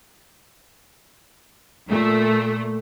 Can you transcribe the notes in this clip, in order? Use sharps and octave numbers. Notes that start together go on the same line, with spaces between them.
A#2 A3